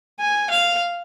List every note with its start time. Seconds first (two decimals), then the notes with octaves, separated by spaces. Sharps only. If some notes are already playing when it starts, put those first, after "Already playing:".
0.20 G#5
0.50 F5